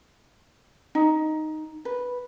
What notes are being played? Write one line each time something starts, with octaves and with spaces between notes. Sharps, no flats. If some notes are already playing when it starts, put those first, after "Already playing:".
D#4
B4